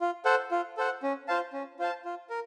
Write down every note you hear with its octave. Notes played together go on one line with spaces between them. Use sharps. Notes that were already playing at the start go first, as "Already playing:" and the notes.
F4
A4 C5 F#5
F4
A4 C5 F#5
C#4
F4 C5 F5 A5
C#4
F4 C5 F5 A5
F4
A#4